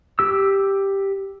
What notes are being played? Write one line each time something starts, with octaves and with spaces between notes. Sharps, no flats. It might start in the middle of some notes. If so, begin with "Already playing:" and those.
G4 E6